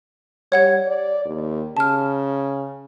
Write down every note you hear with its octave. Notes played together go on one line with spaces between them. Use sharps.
G3 C#5 F#5 G#6
D5
D#2
C#3 A5 F6